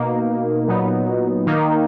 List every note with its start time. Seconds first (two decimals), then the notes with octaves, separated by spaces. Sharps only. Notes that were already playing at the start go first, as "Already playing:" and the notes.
Already playing: B2 A#3 D#4
0.68 A#2 F#3 B3 D#4
1.47 D#3 A#3 D#4